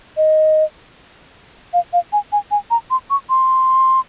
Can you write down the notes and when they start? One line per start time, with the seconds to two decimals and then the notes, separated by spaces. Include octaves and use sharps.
0.17 D#5
1.73 F5
1.93 F5
2.13 G#5
2.32 G#5
2.51 G#5
2.71 A#5
2.91 C6
3.10 C#6
3.30 C6